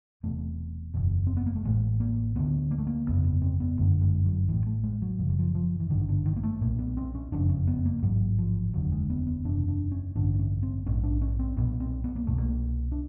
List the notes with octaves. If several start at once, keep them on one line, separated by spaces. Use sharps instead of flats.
E1 E2 C3 A3
F#1 E2 B2
C4
B3
A#3
A3
A1 A2 G#3
A#3
D2 D3 B3
A#3
A3
A#3
G1 F2 C#3 B3
B3
C4
B3
G1 F#2 D3 A3
G#3
F#3
A1 A2 E3
A3
G#3
F#3
F#1 F#2 C#3 F3
F#3
F3
F3
E3
G#1 G2 D3 D#3
D3
D#3
A#3
A3
B1 A#2 A#3
B3
C4
C#4
F#1 F2 C#3 D4
C#4
B3
A#3
A1 G#2 F#3
F3
F1 D#2 D3 F#3
G#3
B3
B3
F#1 E2 C3 D4
D4
C#4
A1 G2 D3 D4
D4
C#4
C4
A#1 G#2 C#4
D4
C#4
C4
B1 A#2 B3
C4
B3
A#3
C2 B2 A3
A#3
D4